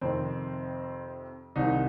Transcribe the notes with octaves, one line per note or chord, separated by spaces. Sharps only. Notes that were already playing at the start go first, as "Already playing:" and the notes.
F2 C3 D#3 C4
C2 C3 D#3 D#4